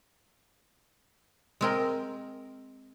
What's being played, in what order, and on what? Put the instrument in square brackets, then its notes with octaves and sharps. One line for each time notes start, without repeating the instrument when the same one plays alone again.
[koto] G#3 C4 A#4